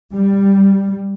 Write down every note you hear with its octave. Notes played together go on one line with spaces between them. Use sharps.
G3